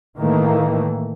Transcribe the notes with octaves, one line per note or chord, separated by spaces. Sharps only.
A2 D#3 E3 A3 A#3